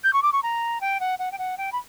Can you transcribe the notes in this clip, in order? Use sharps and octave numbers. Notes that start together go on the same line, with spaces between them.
G6
C#6
D6
C#6
A#5
G5
F#5
F#5
G5
F#5
G5
B5